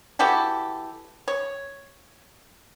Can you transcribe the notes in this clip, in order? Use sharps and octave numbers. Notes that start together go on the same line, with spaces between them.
E3 F#4 G4 A4
C#5